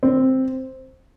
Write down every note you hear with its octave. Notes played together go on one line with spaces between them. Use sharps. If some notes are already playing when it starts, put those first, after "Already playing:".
C4